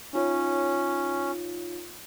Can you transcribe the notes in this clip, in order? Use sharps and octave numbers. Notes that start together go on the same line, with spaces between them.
C#4 D#4 F4 C#5